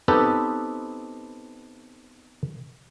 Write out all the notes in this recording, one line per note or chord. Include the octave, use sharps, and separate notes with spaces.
B3 C4 D#4 G4 A4 B4